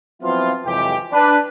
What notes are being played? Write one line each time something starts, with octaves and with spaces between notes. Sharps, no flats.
F3 F#3 B3 C4 E4 F4
F2 C3 E3 F#3 G#3 G4
D4 B4